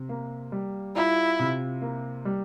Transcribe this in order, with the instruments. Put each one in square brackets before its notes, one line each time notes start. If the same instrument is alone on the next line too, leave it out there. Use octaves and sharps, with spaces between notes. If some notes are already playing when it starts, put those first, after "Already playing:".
Already playing: [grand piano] C3
A#3
G3
[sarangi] E4 [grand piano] F4
[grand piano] C3
A#3
G3